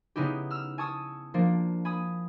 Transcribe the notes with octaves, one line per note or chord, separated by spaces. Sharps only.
C#3 B3 D#4 E4 G4
E6 F6
G#5 A5 C#6 D#6 E6
F3 A#3 D4
G#5 B5 D#6